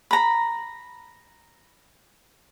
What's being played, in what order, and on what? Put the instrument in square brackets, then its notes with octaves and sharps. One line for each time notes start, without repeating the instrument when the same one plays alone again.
[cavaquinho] A#5 B5